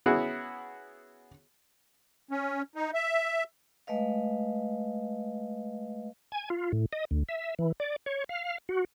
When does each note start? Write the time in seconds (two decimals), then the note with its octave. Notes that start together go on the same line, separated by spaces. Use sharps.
0.06 B3 C#4 E4 F#4 G#4
2.31 C#4
2.75 D#4
2.94 E5
3.87 G#3 A3 B4 D#5 F5
6.32 G#5
6.50 F4
6.72 A2
6.93 D#5
7.11 D2
7.29 E5
7.59 E3
7.80 D5
8.06 C#5
8.29 F5
8.69 F#4